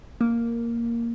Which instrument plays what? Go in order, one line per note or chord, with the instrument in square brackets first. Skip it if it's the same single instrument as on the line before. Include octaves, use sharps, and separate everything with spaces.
[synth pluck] A#3